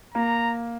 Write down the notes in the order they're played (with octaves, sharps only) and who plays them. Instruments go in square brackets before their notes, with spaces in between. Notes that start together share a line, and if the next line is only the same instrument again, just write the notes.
[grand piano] A#3 [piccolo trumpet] A#5